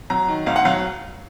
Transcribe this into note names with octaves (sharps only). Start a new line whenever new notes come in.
F#3 A#5
D#3
D2 F5
F#5
F#3 F5